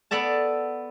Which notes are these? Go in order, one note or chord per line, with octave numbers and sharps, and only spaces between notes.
B3 A4 D5 E5 A5